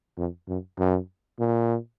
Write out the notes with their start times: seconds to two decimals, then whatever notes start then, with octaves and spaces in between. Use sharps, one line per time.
0.18 F2
0.48 F#2
0.79 F#2
1.39 A#2